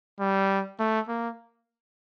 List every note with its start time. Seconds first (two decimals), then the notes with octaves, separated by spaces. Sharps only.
0.20 G3
0.79 A3
1.08 A#3